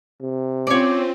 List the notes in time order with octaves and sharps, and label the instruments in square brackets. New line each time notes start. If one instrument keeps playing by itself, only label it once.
[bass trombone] C3
[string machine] C4 [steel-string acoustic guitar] C#4 F4 [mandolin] C#5 D5